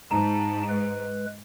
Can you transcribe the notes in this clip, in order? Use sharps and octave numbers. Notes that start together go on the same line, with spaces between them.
G#2 D#4 A5 A#5
G#3 B4